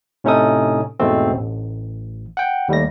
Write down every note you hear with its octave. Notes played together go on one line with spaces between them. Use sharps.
A2 C3 C#4 D#4 A4 D#6
E2 G#2 B2 A3 C4
A1
F#5 G5
D#2 G3 A3 A#6